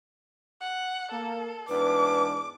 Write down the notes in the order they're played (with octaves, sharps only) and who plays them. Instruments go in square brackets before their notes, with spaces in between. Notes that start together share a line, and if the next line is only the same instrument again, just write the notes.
[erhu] F#5
[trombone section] A#3 [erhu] A4
[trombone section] E2 G#2 D4 [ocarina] B4 [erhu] D6